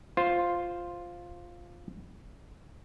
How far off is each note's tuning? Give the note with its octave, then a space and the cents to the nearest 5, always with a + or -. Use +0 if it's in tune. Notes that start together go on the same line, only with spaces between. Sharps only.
F4 +0 C5 +0